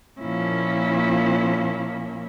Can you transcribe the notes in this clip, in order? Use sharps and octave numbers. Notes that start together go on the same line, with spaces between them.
A#2 F3 A#3 C#4 E4